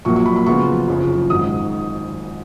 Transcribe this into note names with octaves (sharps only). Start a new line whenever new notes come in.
A#1 A#2 F#3 A#3 C#6
C#6
B5
B5
F2 C#3 F#3 B3 F4 C#6
F#1 F2 C#3 F3
G#1 G#2 D#3 D#6